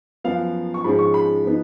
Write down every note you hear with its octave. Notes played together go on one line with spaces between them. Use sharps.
F#2 F3 B3 F5
C#6
G#2 F3 G#3 C#4 B5
C#6
B5
F3 B3 D#4